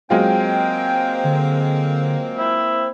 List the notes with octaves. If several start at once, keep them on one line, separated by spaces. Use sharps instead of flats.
F#3 G#3 A#3 C4 F4 G5
D3
E4 C5